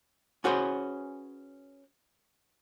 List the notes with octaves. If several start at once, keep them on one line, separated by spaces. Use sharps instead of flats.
C#4 F#4 G#4 B4 C5